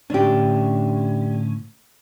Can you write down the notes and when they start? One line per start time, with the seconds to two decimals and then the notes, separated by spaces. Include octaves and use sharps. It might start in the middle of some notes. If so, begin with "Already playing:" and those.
0.10 A2 D3 C#4 D4 G4